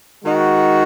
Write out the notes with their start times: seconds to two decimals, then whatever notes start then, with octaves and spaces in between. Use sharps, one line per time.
0.22 D#3 G#3 D#4 F#4